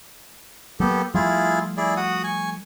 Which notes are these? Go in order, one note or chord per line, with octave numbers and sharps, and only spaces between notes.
F#3 A#3 B3 G4 A4
F3 G3 A3 E4 F4 G#4
E4 G#4 D5
F#4 F#5 D#6
G#5 C#6